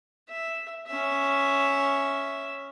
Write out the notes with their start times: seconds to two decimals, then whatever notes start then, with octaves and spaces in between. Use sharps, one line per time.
0.28 E5
0.87 C#4 E5